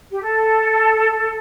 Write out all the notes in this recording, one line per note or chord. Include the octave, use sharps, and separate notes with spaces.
G4
A4